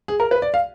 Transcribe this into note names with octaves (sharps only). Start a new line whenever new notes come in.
G#4
A#4
B4
D5
F5